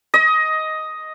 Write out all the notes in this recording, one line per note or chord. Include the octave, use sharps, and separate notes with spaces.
D#5